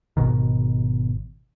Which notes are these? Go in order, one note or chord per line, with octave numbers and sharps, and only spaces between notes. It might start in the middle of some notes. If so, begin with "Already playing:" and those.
G#1 G#2 B2 D#3